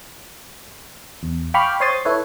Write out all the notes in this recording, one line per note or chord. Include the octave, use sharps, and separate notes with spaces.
E2
F5 G5 B5 C#6 D6 F6
C5 C#5 C6 D#6 A6
E4 A4 B4 C#5